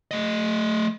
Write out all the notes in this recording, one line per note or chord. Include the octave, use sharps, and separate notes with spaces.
A3 D#5